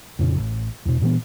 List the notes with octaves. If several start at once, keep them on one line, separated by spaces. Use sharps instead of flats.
F2 A#2 C#3
A1
E2 B2
A#2 E3 B3